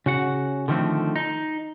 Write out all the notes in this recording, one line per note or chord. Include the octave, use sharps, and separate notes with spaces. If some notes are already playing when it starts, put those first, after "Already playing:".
C#3 F#4 F#5
D3 D#3 F3 A3 C4
D#4